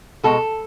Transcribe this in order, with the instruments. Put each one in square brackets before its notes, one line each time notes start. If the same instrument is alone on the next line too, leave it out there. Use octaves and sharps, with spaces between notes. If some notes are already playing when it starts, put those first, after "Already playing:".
[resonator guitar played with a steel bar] B2 G#3 B3 A4